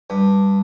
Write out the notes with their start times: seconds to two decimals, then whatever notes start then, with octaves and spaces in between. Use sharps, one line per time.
0.10 G2